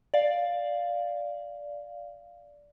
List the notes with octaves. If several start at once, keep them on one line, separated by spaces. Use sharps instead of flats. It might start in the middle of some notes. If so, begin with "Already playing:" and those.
D5 F5